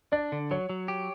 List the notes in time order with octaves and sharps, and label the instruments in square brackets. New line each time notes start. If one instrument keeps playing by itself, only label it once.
[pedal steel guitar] D4 [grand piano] D5
[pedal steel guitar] D3
[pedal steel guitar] F#3 [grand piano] C#5
[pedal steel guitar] F#3
G4